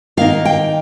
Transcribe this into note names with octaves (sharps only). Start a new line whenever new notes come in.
D#3 A#3 D#4 F5
G5